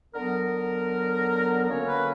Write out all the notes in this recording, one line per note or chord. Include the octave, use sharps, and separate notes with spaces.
D3 F#3 B3 A#4
D3 F#3 A#3 C#4 C#5
B4